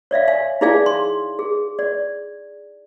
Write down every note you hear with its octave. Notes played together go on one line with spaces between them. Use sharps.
C#5 D5 E5 F5
F5 G#5
D#4 E4 G#4 D5 F5 G#5
C6
G#4
D5